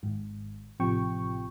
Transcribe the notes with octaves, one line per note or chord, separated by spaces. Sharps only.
G#1 G#2
A1 C3 F3 G5 C#6